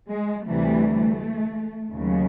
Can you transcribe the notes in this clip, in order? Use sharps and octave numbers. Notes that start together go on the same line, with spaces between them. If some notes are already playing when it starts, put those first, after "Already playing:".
G#3
D2 C3 E3 G3 A3
D#2 C#3 F#3